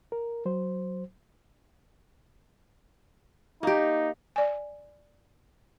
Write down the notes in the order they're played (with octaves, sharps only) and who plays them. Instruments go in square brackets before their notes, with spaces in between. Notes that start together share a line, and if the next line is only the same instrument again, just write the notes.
[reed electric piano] A#4
F#3 C5
[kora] A#3 G4 [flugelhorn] D#4
[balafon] D5 G#5